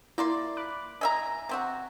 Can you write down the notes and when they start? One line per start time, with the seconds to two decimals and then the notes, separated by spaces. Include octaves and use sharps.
0.18 A#3 E4 D5 C6
0.57 B5 D6 F#6
1.01 D#5 E5 G#5 A#5
1.49 C3 C4 F#4